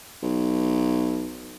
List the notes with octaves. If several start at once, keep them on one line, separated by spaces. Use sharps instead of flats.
B1